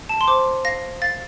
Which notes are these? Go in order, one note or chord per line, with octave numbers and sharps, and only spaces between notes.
A5
C6
C5 D6
F5 A#6
F5 A6